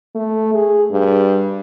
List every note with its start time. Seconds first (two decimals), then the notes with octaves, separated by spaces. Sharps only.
0.15 A3
0.54 G#4
0.91 G2